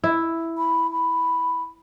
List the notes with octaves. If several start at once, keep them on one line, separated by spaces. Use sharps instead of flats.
E4
B5
B5